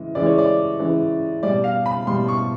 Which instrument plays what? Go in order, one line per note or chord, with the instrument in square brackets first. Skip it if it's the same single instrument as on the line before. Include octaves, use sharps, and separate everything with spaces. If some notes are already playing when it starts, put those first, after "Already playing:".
Already playing: [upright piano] C#3 E3 G#3
C#3 E3 G#3 D5
C#5
D5
C#3 E3 G#3
B2 G3 D5
F5
B5
B2 G3 C6
C#6